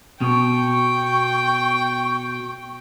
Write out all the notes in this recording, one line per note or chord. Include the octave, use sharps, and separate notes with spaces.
B2 G5 C#6